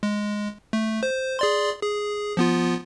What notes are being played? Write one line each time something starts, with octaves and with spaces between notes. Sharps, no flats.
G#3
A3
C5
G#4 D5 C6
G#4
F3 B3 F4